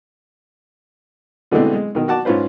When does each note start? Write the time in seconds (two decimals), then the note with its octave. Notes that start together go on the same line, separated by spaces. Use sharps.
1.51 B2 D3 E3 G#3 A3 C4
1.74 G#3
1.95 B2 D#3
2.08 F#4 F#5 A5 D6
2.25 G#2 C#4 F4 B4 C5